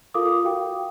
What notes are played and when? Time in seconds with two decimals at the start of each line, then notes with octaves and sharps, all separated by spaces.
0.14 F4 A4 A#4 F5 D6 D#6
0.44 F#4 F5 G5